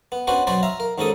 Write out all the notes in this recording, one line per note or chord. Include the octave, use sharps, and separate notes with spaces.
B3
B3 C#4 D4 F#4 B4 C5
B2 F#3 F#4 B4 C5 D5
E5 F5 A#5
A#4
D#2 G#2 C#4 D#4 A4 D#6